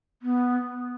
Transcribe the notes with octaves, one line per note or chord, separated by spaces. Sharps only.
B3